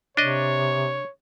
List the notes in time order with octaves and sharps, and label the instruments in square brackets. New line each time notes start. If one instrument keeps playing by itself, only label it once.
[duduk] C3 [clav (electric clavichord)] D4 D#5 [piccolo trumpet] C#5